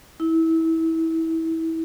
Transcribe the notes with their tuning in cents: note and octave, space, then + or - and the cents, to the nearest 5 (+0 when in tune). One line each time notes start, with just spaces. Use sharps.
E4 -25